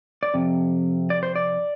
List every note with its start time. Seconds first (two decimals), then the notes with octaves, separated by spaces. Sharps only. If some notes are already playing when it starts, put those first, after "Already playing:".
0.23 D5
0.34 F2 C3
1.10 D5
1.23 C5
1.36 D5